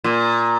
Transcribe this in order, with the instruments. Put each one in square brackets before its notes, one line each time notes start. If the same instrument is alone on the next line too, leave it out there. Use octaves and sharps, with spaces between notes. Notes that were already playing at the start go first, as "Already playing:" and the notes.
[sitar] A#2